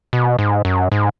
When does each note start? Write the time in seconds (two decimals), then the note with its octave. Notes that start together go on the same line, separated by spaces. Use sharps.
0.13 B2
0.39 G#2
0.65 F#2
0.92 G#2